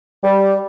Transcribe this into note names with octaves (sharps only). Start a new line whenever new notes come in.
G3